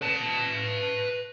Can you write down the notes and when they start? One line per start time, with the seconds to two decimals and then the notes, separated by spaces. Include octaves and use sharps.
0.02 B4 A5